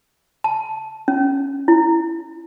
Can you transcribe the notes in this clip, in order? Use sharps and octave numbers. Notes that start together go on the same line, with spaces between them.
A5
C#4
E4